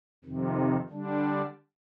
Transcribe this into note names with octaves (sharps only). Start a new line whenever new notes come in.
F2 C3 D#3
D3 G3 D4